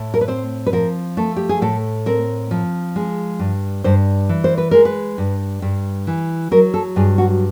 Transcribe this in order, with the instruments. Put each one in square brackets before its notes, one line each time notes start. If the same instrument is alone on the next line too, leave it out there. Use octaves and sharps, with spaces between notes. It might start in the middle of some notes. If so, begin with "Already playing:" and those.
Already playing: [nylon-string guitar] A2 A3
A#4
B4
C4 C5
B4
F3 A#4
A3 A4
G4
G#4
A2 A4
C4 A#4
F3
G#3
G2
G2 C5
E3
C5
B4
G#3 A#4
B4
G2
G2
E3
F#3 A#4
A4
G2 G#4
F#4